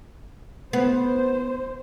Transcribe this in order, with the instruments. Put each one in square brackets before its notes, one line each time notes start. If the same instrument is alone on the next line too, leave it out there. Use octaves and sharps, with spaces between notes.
[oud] B3 [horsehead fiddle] C5